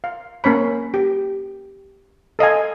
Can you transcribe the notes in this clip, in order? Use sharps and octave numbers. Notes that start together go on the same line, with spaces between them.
F5
A#3 C#4 C#5 B5
G4
A4 D#5 F5 G#5